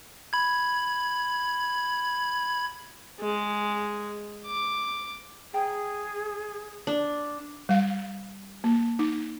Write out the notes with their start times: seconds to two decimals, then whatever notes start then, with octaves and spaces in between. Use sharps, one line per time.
0.33 B5 G#6
3.20 G#3
4.46 D6
5.54 G#4 C5 G5 A#5
6.87 D4
7.69 G3 F5
8.64 A#3
8.99 D#4